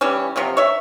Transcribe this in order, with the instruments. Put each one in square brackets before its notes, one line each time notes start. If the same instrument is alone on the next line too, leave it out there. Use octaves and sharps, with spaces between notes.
[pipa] E3 G3 C#4
C3 F3 F#3
C#5 E5